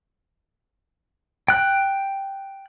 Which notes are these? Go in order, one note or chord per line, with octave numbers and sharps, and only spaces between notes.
G5 F#6